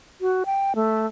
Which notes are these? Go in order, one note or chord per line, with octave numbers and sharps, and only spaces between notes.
F#4
G5
A3